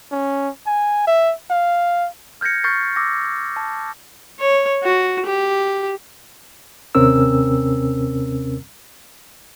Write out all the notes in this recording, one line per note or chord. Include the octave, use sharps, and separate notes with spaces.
C#4
G#5
E5
F5
F6 G6 G#6 A#6 C#7
C#6 F6 G6 A6 C7
D6 E6 A#6
A5
C#5
F#4
G4
D#2 C3 C4 C#4 A#4 E6